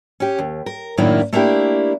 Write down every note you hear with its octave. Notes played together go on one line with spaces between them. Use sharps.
C#4 G4
D#2
A#4
F#2 A2 D#3 A#3 D4 E4
A3 A#3 D4 E4 G4